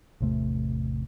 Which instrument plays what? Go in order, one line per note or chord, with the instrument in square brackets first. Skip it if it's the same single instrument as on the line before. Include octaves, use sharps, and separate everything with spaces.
[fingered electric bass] A1 E2 C3 A3